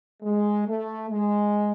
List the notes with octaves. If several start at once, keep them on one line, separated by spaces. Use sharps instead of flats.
G#3
A3
G#3